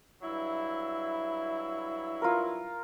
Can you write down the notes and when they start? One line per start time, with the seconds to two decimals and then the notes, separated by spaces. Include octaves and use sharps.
0.22 G2 F#3 E4
2.22 F4 A#4